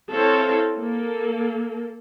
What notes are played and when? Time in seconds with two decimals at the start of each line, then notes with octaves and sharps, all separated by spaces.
0.11 C4 E4 A4 C#5 F5
0.76 A#3 A4